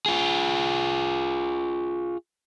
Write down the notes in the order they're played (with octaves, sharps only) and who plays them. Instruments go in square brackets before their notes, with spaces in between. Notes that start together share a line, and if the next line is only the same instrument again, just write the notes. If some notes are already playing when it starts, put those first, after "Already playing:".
[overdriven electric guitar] F4 G#4